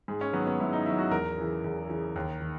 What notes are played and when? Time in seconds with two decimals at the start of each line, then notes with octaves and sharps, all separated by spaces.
0.08 G#2 G#4
0.21 C#4
0.33 D#3 F#3 B3
0.47 B3
0.60 G#2 E4
0.73 D#4
0.86 D#3 F#3 E4
0.98 F#4
1.11 E2 A#4
1.38 C#3 E3
1.64 E2
1.89 C#3 E3
2.16 D#2
2.41 D#3